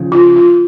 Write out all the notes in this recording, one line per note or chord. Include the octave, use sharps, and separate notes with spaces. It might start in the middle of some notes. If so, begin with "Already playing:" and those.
Already playing: C#3 F3
F4
F4